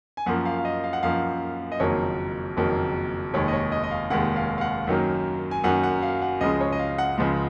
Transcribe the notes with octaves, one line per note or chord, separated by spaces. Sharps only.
G#5
F#2 F3 A#3 F#5
F5
F5
D#5
F5
F#5
F#2 F3 A#3 F5
D#5
F#1 F2 D#3 F#3 A#3 C#5
F#1 F2 D#3 F#3 A#3
F1 D#2 D#3 G#3 C#5
D#5
C#5
D#5
D#5
F5
F1 D#2 D#3 G#3 F#5
F5
F5
F#5
F#2 D#3 F#3 A#3
G#5
F#2 D#3 F#3 A#3 F#5
F#5
F5
F#5
C#2 C#3 F3 G#3 D#5
C#5
D#5
F5
F#5
C#2 C#3 F3 G#3 F#5